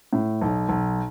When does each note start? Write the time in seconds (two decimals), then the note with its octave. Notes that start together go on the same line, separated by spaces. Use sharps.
0.13 A2
0.42 B1
0.69 B1